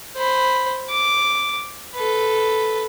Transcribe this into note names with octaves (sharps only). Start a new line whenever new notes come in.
C5 B5
D6
A4 B4